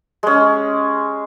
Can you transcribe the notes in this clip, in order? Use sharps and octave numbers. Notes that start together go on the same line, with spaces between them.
G#3 C#4